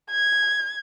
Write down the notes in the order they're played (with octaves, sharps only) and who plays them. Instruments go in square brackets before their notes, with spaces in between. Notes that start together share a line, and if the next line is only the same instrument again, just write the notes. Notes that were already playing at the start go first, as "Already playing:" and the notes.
[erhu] G#6